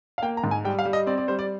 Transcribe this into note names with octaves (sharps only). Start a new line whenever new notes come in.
F5
A#3 G5
A#5
G#2
G#5
G3 G5
F5
G3
D#5
C4 D5
D5
G3 C5
D5